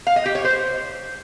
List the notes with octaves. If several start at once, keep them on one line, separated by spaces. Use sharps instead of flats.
F5
D#5
G4
C#5
C5